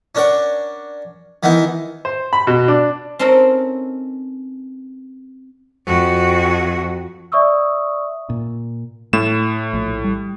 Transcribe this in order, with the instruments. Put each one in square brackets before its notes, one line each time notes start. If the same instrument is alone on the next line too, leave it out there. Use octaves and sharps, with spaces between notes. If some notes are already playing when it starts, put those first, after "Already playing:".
[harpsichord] C#4 D4 A#4 C#5 F#5
D#3 E3 B3 D#4 E4 A#4
[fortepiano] C5
B5
B2
D4
[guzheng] C4 C#4 D#4 A4 A#4
[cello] F2 F#4
[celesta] D5 E5 C#6 D#6 E6
[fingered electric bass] A#2
[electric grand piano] A2 E7 [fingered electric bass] A3
[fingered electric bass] A#1
G3